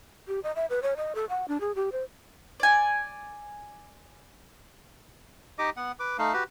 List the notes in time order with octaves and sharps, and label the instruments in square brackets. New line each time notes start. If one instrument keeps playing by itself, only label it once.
[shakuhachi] G4
D#5
E5
B4
C#5
D#5
A4
F#5
D4
G#4
G4
C5
[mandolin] D5 G#5
[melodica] D#4 G4 D#5 D6
B3 F#5
B4 D6
A3 D#4 F5
F#4 G4 B4